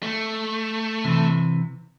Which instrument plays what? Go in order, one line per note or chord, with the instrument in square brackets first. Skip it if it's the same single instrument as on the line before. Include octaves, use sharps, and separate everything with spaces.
[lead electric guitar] A3
[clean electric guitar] C3 E3